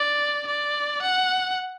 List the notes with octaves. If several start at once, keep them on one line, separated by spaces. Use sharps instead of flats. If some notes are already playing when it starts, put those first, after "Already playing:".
Already playing: D5
D5
F#5